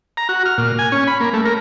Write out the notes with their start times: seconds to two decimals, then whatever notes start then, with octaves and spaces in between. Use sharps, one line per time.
0.17 A#5
0.29 F#4
0.46 F6
0.58 A#2
0.79 G#5
0.92 C#4
1.07 B5
1.21 A#3
1.34 A3
1.45 A#4